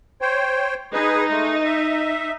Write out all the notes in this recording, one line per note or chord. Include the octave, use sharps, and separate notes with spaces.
C5 C#5 G5
D#4 G#4 B4
G#3 A3
E5